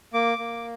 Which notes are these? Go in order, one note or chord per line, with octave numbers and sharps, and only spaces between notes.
A#3 D6
A#3